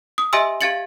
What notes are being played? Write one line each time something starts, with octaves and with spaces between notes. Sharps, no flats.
D#6
G4 D#5 E5 G#5 C6 E6
G4 F5 G#6 A6 C#7 F#7